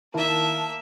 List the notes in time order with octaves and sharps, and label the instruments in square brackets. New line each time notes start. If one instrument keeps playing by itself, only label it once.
[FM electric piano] D#3 E4 A#4 [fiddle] A#3 E5 [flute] A5